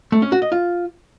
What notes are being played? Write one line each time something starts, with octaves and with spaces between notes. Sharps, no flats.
A3
C#4
F#4
D#5
F4